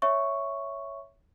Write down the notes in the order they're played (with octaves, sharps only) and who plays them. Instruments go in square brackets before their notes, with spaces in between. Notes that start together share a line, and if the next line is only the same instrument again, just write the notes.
[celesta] C#5 E5 C#6